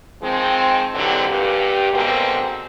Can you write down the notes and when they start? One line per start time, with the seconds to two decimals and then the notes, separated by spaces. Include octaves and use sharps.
0.23 D#3 F3 G#3 C4
0.94 G#2 D3 E3 F#3 C4 G4
1.28 G2 A#2 G4
1.92 G#2 B2 D3 G#3 A#3 C4